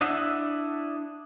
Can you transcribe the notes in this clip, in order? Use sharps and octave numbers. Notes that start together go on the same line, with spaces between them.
D4 E4 D#5 E5 F#5